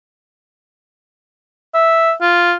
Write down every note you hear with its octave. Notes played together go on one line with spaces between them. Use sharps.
E5
F4